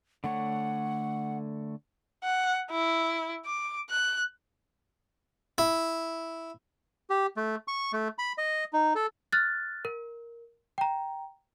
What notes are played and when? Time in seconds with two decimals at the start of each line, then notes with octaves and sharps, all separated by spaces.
0.24 D3 A3 C#5 F#5
2.24 F#5
2.71 E4
3.46 D6
3.90 F#6
5.58 E4
7.10 G4
7.37 A3
7.68 C#6
7.93 A3
8.18 B5
8.38 D#5
8.73 D#4
8.95 A4
9.32 F6 F#6 A6
9.85 A#4
10.78 G5 A#5